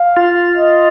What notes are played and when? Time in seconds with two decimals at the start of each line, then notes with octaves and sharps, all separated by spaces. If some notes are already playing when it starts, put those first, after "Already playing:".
Already playing: F5
0.17 F4
0.57 D#5